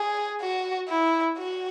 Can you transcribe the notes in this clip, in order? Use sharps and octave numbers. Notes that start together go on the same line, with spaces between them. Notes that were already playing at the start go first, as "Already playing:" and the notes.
Already playing: G#4
F#4
E4
F#4